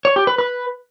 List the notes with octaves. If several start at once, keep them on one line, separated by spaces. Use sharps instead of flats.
C#5
G4
B4
B4